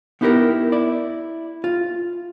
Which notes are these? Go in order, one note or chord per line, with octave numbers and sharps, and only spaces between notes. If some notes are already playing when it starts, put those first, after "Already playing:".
B3 D#4 E4 G4 G#4 A#4
E4 D5
F4